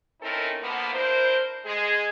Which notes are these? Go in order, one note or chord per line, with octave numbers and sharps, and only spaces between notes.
C4 C#4 D#4 E4 A4 A#4
B2 D3 F3 A#3 B3
D4 E4 A#4 C5
G#3 G#4